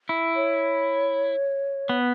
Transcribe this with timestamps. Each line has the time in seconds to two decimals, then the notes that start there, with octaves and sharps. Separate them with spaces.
0.09 E4
0.35 C#5
1.89 B3